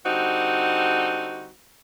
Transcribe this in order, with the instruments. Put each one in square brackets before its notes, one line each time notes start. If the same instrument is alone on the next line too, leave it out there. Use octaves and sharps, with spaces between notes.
[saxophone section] D3 G3 C4 D#4 F#4